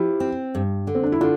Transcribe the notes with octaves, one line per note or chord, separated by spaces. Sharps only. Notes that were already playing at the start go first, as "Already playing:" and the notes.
Already playing: F3 E4 G4
C4
G2
D3
C4
D4
E4
D3 D4 F4